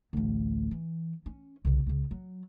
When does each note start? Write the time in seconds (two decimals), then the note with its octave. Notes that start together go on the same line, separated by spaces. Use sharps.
0.13 A1 D2
0.71 E3
1.26 C#4
1.65 C2 C#3
1.86 C#2 C#3
2.11 F#3